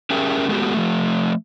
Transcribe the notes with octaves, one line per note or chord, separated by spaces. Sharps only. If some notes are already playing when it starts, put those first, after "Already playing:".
C#4 G4 G#4 A#4 E5 G5
G#3 A3 B3 F#4 G4
F3 A3